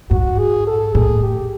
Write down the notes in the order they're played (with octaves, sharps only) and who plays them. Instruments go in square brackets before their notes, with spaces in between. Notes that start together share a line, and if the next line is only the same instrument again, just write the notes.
[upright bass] G#2 [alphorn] F#4
[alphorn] G#4
A4
[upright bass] A2 [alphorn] G#4
[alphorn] G4